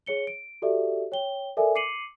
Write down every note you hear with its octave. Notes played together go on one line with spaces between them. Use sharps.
G#4 C#5 C#7 G7
D7
F#4 G4 A4 D5 E5
C#5 G5 G7
A4 A#4 D5 E5 G#5
D6 C7 C#7 D#7 F#7